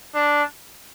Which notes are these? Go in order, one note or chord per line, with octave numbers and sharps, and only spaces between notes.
D4